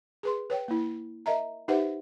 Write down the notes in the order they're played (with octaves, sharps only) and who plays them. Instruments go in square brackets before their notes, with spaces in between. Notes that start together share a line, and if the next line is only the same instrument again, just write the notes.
[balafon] G#4 B4 C6
B4 C#5 G5
A#3 E4
A#4 D#5 E5 A#5
D#4 G4 B4 C5 E5 F#5